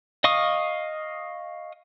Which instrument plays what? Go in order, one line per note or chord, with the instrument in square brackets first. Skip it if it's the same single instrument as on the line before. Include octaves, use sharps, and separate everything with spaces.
[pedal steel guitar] D#5 F5 C#6 D#6